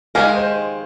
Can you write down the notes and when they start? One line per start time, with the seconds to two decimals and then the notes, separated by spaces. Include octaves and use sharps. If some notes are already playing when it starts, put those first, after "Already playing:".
0.15 D#3 G#3 C4 G4 A#4 F5 G#5
0.36 C5